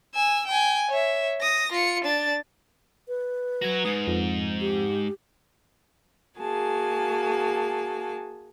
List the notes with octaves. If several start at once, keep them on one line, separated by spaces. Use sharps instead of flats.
G#5 E6
G5 G#5
C#5 E5
D#6 A#6
F4 C#7
D4 A6
B4
F#3 F#4 G#5 A#5
G#2 D#5 G#5
F2
G4
A#3 F#4 G#4 G#5 A5